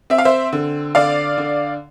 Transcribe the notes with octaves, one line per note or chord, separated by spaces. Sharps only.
C4 E5
F5
C5 E5
D3
D3 D5 F5
D3